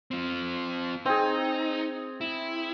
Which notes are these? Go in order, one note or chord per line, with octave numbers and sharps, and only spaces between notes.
C4 F4
C4 D#4 G#4
E4